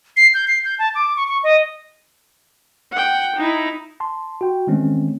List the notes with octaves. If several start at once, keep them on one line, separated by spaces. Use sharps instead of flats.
C7
G6
C7
G6
A5
D6
C#6
C#6
D#5
F#5 G5
D#4 E4
A5 C6
F#4 G5
D#3 E3 G#3 A3 C4 C#4